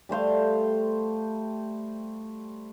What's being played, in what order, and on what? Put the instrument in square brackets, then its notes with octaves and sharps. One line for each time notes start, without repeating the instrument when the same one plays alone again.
[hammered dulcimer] G3 A3 C5 F5